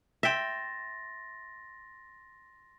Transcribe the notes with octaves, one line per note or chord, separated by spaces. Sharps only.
E5 G5 C6 A6 A#6